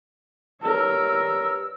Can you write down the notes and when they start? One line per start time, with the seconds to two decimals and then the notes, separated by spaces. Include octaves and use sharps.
0.62 G2 A#4 C#5 E6